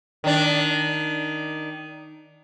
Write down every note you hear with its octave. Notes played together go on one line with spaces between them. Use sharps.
D#3 D4